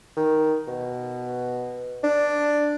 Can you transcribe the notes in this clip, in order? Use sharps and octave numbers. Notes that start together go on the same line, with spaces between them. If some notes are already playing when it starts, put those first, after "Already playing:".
D#3
B2
D4